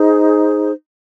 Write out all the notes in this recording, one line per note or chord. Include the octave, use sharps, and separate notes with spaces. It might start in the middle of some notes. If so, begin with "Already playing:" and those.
Already playing: D#4 G#4 C5